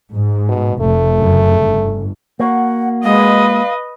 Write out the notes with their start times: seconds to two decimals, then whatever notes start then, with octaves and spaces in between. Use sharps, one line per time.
0.12 G#2
0.49 B2
0.80 F1 A3
1.19 F#2 C#3
1.57 G1
2.40 A#3 F#4 F#5
3.04 G#3 B4 D#5 F5